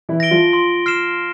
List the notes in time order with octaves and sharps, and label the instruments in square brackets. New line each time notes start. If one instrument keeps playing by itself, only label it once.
[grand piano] E3 E4
[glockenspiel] A#6 D7 G7
[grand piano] F3 F4
[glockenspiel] C6
F6 C7 E7